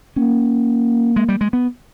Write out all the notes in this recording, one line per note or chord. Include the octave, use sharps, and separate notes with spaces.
A#3 C#4
G#3
G3
G#3
B3